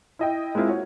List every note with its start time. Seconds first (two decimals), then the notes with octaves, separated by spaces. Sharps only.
0.19 E4 D#5 G5
0.55 G#3 A#3 C4 E4 F4
0.67 F#4 C#5